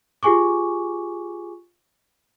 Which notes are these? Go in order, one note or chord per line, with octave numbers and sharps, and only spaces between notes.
F4 G4 G#4 G#5 C#6 D6